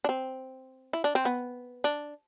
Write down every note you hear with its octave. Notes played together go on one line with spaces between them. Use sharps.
D4
C4
E4
D4
C4
B3
D4